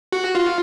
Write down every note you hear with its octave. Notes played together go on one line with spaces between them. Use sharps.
F#4
F4